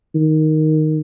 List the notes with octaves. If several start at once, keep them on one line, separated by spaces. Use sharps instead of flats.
D#3